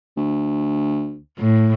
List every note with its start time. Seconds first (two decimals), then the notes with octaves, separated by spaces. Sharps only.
0.17 D2
1.38 A2